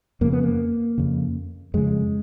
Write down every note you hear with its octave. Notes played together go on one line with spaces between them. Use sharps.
F2 C#3 A#3
B3
A#3
F2 C#3
F2 C#3 G#3